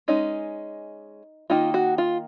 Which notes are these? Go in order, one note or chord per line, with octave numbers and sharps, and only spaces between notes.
G#3 C#4 D#4
D#3 A#3 D#4 F4
F#4
F4